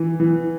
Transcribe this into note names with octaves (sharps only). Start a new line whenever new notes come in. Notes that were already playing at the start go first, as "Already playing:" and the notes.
Already playing: E3
E3